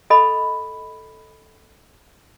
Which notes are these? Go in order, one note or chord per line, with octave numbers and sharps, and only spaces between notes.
A4 D#5 B5